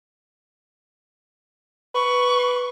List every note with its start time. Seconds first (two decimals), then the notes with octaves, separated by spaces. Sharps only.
1.95 B4 C#6